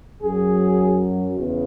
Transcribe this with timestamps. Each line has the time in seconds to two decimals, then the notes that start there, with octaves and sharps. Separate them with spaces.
0.23 F#2 F#3 G#4
1.34 E2 C#3